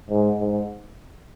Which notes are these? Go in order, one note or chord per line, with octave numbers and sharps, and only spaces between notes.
G#2
G#2